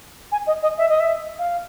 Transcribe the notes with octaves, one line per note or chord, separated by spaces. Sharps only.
G#5
D#5
D#5
E5
D#5
E5
F5